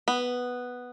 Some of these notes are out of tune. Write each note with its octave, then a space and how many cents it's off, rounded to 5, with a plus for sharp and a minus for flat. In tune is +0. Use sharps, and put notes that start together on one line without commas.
B3 +0